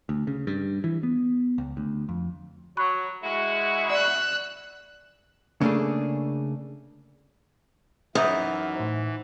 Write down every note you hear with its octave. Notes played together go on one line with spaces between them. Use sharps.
D2
C#3
G2
E3
B3
C#2
D2
F2
F#3 B5 C#6 F#6
G#3 E4 F#4
D5 E6 F#6
C#3 A3 A#3 D4 G#4
F#2 E3 D#4 B4 F6
A2 C5